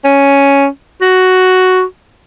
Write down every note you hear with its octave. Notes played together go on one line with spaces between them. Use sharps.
C#4
F#4